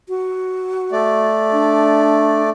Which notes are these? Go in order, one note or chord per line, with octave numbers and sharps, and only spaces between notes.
F#4
A3 D5
D4